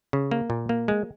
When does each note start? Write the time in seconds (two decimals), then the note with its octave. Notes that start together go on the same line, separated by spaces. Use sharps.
0.13 C#3
0.31 A#3
0.50 A#2
0.69 A#3
0.88 G#3